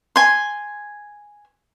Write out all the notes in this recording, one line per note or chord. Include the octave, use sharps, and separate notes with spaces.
G#5 C6